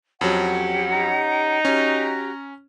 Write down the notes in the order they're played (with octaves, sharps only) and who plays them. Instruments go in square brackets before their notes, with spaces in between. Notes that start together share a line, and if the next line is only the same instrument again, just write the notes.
[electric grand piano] F2 F#3 [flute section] C#4 G4 F#5
[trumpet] D#4 [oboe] A#5
[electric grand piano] C#4 [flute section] F#4 G4